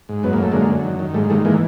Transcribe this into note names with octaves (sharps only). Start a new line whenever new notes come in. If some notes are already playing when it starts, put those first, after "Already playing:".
G#2
F#2 B3
A#3
F#2 A3
D3 G#3 A#3
F#2
D#3
D#3
G#2 G3 A3
D#3 G3 A3
E3 G#3 A#3